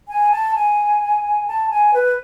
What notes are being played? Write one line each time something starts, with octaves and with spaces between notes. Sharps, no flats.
G#5
A5
G#5
A5
G#5
B4